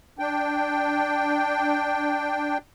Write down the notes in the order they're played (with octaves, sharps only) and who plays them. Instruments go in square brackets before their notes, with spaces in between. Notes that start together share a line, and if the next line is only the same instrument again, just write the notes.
[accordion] D4 G5